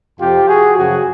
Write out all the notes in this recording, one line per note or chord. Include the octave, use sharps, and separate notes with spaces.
F2 C3 F3 F4 G4
F#4 G#4
F#2 C#3 F3 F#4 G#4